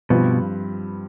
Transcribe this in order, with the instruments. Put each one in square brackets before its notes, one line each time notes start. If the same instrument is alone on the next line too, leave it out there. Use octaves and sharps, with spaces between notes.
[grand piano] G2 F3 C4 F4 B4 [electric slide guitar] B2